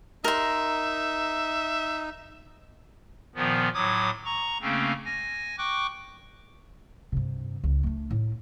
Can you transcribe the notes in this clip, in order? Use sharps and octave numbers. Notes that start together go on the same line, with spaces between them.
D#4 A#4 E5 C6
A#2 D#3 F3 B3
A2 F#3 D6 D#6 G#6
A#5 C#6
C#3 A3 A#3 C4 C#4
G#5 A#6
G5 C#6 D6 F#6
G2 C3
C#2
A3 D4
A2